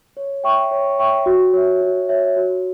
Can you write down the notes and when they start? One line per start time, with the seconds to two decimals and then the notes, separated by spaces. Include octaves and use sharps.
0.17 C#5
0.44 E5 G5 C#6
0.71 C#5
0.99 E5 G5 C#6
1.26 F#4
1.53 C#5 E5
1.82 F#4
2.09 C#5 E5
2.36 F#4